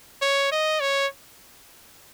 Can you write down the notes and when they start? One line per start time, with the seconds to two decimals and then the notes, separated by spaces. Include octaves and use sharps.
0.22 C#5
0.52 D#5
0.80 C#5